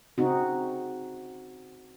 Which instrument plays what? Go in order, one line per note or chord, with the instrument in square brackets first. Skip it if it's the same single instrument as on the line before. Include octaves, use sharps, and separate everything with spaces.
[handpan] C#3 C4 D#4 F#4